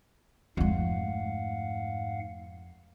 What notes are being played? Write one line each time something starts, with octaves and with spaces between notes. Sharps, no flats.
F2 G#2 G#3 A3 F5 F#5